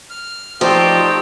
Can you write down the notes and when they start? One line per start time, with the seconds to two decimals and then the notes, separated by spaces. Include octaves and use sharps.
0.10 F6
0.61 F3 A3 C4 D#4 G4 C5 D5 D#5